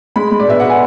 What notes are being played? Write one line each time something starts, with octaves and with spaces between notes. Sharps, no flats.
G#3 B5
G#3
D5
B2 E5
B2 F#5
G#5